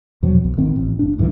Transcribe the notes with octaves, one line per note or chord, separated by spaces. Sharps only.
E2 B2 F3 F#3
B1
G#1 D#3 C4
A1
F1 D4
C2 G#2 D3 E3